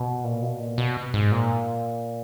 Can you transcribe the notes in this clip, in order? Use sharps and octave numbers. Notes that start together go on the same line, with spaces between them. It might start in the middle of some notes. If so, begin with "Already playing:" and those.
Already playing: B2
A#2
B2
A#2
B2
G#2
A#2